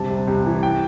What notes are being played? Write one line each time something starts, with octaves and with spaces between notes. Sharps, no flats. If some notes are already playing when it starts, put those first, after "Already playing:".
Already playing: G2 C3 A5
C2
C2
E3
G5